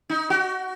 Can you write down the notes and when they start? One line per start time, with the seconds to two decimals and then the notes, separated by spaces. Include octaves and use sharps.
0.09 D#4
0.30 F#4